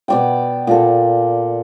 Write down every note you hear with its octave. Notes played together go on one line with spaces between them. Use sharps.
B2 D5 G5
A#2 A4